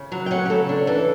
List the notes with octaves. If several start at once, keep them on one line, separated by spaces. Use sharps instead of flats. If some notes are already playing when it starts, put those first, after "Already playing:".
Already playing: C#3
F#3 F#5
G5
C#4 F#5
G4
C#3 A4
D4
E3 A4